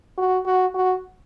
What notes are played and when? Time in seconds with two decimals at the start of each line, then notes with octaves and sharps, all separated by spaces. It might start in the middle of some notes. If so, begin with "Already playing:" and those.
0.18 F#4
0.46 F#4
0.74 F#4